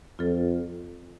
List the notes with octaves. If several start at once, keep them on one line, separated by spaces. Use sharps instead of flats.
F2 F4 A4